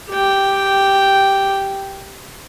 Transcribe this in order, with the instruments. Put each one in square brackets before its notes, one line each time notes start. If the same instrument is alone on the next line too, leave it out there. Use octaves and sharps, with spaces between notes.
[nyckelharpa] G4 G5